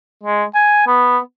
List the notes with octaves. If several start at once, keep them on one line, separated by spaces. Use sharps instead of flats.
G#3
G#5
B3